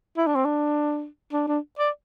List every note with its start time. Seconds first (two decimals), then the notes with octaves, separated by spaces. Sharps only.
0.17 E4
0.27 D4
0.35 C4
0.45 D4
1.32 D4
1.48 D4
1.79 D5